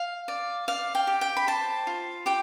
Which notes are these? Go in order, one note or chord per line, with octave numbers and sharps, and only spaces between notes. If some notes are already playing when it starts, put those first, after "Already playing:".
Already playing: F5
D5
D5 F5
G5
G4
G5
B5
C5 A5
F4
G4 G5